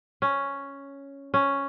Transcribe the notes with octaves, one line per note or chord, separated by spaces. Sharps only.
C#4
C#4